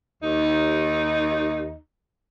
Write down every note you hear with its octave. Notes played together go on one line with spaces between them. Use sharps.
D#2 D#4